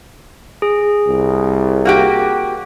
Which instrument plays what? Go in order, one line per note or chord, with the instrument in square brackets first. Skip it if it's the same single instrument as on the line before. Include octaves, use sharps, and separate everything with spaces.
[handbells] G#4
[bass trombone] C2
[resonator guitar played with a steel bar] A#3 F#4 G4